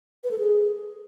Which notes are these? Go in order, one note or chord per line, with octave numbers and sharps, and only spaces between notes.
B4
A4
G#4